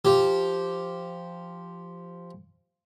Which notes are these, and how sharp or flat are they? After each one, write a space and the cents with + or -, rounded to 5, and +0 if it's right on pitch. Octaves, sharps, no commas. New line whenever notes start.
F3 -5 G4 +0